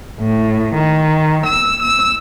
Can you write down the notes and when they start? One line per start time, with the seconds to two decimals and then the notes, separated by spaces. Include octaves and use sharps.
0.20 A2
0.74 D#3
1.45 E6
1.82 E6